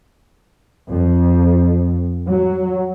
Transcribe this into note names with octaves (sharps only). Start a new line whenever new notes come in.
F2
F#3